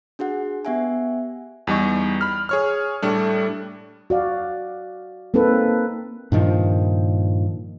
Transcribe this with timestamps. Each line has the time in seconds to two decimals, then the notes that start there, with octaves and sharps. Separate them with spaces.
0.19 D4 F#4 G#4 F#5
0.65 B3 G4 E5 F#5 G#5
1.67 E2 G3 D#4 C#6
2.21 B5 F6
2.49 G#4 C#5 F6
3.02 A2 G3 A3 D4
4.10 F#4 D5 F5
5.34 A#3 C4 D#4 A4 B4
6.32 G2 A#2 D#3 F3